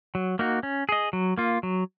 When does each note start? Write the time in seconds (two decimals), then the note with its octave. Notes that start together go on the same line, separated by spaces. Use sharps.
0.15 F#3
0.39 A#3 D#4 F#4
0.63 C#4
0.89 G#4 D#5
1.13 F#3
1.38 A#3 F4
1.63 F#3